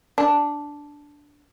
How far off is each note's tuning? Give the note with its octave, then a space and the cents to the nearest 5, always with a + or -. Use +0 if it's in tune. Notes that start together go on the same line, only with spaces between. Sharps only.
D4 -5